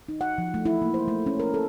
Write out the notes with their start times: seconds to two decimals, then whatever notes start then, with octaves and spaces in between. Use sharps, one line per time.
0.09 D#4
0.21 F#5
0.38 F3
0.54 A3
0.66 E4
0.82 A#3
0.94 C5
1.08 A3
1.26 C#4
1.39 A#4
1.54 A4